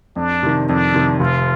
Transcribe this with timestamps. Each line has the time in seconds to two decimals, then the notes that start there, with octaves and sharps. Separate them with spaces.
0.16 F2 D4
0.43 C3 D#3
0.68 F2 D4
0.94 C3 D#3
1.20 F1 F4